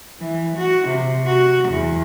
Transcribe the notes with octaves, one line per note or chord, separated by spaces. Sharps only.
E3
F#4
C3
F#4
E2